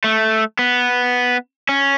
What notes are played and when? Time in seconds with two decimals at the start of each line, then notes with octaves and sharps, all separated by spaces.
0.04 A3
0.59 B3
1.69 C#4